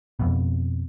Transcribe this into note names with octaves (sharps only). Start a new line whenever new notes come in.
F2 B2